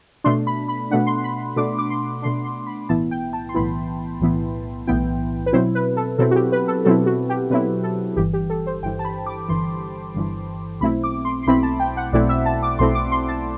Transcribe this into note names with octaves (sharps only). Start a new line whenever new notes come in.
B2 A3 D4 C6
B5
B5
B2 A3 D4 F#5
C6
B5
B2 A3 D4 D6
D6
C6
B2 A3 D4 C6
C6
B5
B1 A2 E3 B3 E4 A5
G5
A5
C6
B1 A2 E3 B3 E4 B5
B1 A2 E3 B3 E4
B1 A2 E3 B3 E4 G5
B4
B2 F#3 C4 E4 C5
B4
A4
B2 F#3 C4 E4 A4
F#4
G4
B4
A4
B2 F#3 C4 E4 A4
F#4
G4
B2 F#3 C4 E4 B4
A4
G1 G2 E3 G4
G4
A4
C5
G1 G2 E3 G5
A5
B5
D6
G1 G2 E3 C6
G1 G2 E3
B1 B2 A3 C4 E4 B5
D6
C6
C6
B1 B2 A3 C4 E4 B5
A5
G5
F#5
B1 B2 A3 C4 E4 D5
E5
A5
D6
B1 B2 A3 C4 E4 C6
D6
C6
A5